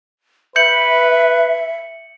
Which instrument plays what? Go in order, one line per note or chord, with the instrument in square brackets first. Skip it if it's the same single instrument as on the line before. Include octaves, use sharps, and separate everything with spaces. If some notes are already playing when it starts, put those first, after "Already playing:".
[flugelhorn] B4 [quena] E5 [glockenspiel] G6 C#7 F#7